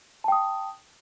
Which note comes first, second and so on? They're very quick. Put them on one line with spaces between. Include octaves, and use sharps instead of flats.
A5 G5 D#6